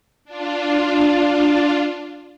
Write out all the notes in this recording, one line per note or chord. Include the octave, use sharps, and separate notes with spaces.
D4 F4